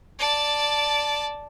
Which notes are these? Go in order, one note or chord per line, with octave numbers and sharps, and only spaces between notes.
D5 A5